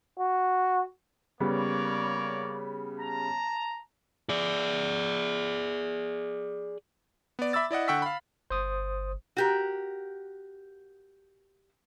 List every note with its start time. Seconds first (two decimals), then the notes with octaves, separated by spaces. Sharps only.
0.20 F#4
1.40 C#3 G3 A#3 B3 C#5 D5
2.99 A5 A#5
4.29 G#4 D5
7.39 B3 D5
7.53 E5 B5 D6 E6 A6
7.71 E4 D5 D#5 F#5
7.88 D3 F#5 G5 C#6 E6 B6
8.02 F5 B5
8.50 G1 C5 D#6
9.37 F#4 G4 A#4